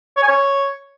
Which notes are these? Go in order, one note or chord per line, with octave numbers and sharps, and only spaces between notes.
C#5
G#5
C#5